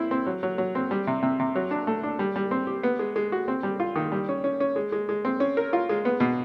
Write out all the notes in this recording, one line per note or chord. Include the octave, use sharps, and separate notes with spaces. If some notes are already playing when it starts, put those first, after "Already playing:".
Already playing: C4 E4
C4
F#3
F#3
F#3
C4
G3
C3
C3
C3
F#3
D4
A3
D4
G3
G3
C4
G4
B3
G#3
G#3
F#4
C4
G3
F4
D#3
G3
C#4
C#4
C#4
G#3
G#3
G#3
C4
C#4
A#4
F4
G#3
B3
B2